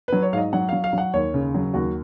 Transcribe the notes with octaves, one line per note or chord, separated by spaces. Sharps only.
F#3 B4
C#5
G#2 D#5 F5
F#3 F#5
F#3 F5
F5
F#3 F#5
D#2 C#5
C#3
F#3
D#2 F#4